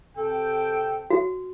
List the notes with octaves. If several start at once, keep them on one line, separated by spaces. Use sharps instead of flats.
C3 A4 G5
F#4